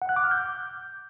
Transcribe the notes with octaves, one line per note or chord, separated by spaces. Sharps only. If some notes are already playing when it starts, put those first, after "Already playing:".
F#5
F#6
D6
F6
G6